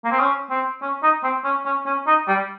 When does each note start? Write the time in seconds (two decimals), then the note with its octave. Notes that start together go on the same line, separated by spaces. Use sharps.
0.05 A#3
0.11 C4
0.19 C#4
0.51 C4
0.82 C#4
1.03 D#4
1.23 C4
1.44 C#4
1.65 C#4
1.86 C#4
2.07 D#4
2.28 G3